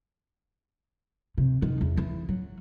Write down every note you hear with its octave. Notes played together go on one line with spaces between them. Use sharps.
C3
D#3
E2
E3
F#3